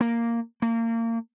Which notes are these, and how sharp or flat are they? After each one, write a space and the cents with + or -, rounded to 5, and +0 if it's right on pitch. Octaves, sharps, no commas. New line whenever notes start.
A#3 -5
A#3 -30